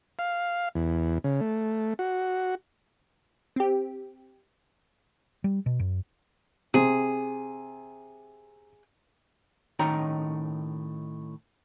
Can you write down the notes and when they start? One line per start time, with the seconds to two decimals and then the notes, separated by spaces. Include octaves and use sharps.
0.19 F5
0.75 E2
1.24 C#3
1.41 A3
1.99 F#4
3.56 C4 G4
5.44 G3
5.66 B2
5.79 F#2
6.74 C3 G#4
9.79 A2 D#3 C#4 D#4 A#5